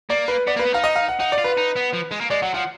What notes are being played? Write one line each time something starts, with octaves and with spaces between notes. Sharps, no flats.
A#3 D5
B4
B3 D5
A#3
B4
B3
D#4 F5
D#5
F5
F#5
D#4 F#5
D5
F4
B4
D#4
B3
F3
G#3
A#3
G#3 D5
F#3 F#5
F3 F#5